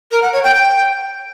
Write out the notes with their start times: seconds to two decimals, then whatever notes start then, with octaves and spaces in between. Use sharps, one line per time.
0.11 A#4
0.22 F#5
0.32 C#5
0.43 G5
0.54 G5